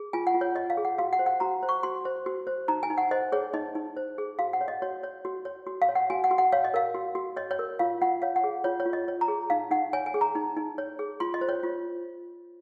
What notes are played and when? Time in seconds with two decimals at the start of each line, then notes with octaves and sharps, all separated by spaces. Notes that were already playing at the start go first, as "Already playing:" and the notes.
Already playing: G#4
0.13 F4 G#5
0.27 F#5
0.34 F4
0.41 C#5
0.55 C#5 D#5
0.70 F5
0.77 G#4
0.85 F#5
0.98 F#4 F5
1.13 F#5
1.19 C5
1.26 F#5
1.40 F#4 A#5
1.63 C5
1.69 C#6
1.83 F#4 C6
2.05 C5
2.26 F#4
2.47 C5
2.68 D#4 A#5
2.83 G#5
2.90 D#4
2.98 F#5
3.11 C5 D#5
3.32 G#4 C#5
3.54 D#4 D#5
3.75 D#4
3.97 C5
4.18 G#4
4.39 F#4 F5
4.53 F#5
4.61 C#5
4.68 D#5
4.82 F#4 C#5
5.03 C#5
5.25 F#4
5.45 C#5
5.67 F#4
5.82 F5
5.88 C#5
5.95 F#5
6.10 F#4 G#5
6.24 F#5
6.31 F#4
6.38 F#5
6.52 C#5 F5
6.65 D#5
6.74 A#4 F5
6.95 F#4
7.15 F#4
7.37 C#5 D#5
7.51 C#5
7.59 A#4
7.79 F4 F5
8.01 F4 F#5
8.22 C#5 F5
8.36 F#5
8.44 G#4
8.64 F4 C#5
8.80 C#5
8.86 F4
8.93 D#5
9.08 C#5
9.21 A#5
9.28 G#4
9.50 D#4 F5
9.71 D#4 F#5
9.93 C#5 G#5
10.06 G#5
10.14 G#4
10.21 A#5
10.35 D#4
10.57 D#4
10.78 C#5
10.99 G#4
11.20 F4 C6
11.34 D#5
11.41 C5
11.49 C#5
11.64 F4